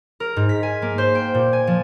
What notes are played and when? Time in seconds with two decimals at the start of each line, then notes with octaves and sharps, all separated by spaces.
0.20 A#4
0.36 G#2
0.49 B6
0.63 G#5
0.82 A#3
0.98 C5
1.15 G5
1.34 A#2
1.53 G#5
1.67 F3